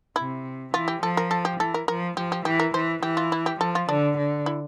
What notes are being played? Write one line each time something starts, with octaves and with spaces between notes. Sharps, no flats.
C3 E4
E3 F4
G4
F3 A4
A#4
A4
G4
E3 A4
A#4
F3 A#4
F3 G4
G4
E3 G4
A#4
E3 C5
E3 G4
F4
E4
G4
F3 A4
F4
D3 D4
D3
E4